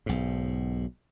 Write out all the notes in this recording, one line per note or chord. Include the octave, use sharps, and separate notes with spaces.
B1 G#2